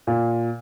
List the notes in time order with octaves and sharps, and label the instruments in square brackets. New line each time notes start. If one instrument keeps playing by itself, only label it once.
[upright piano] A#2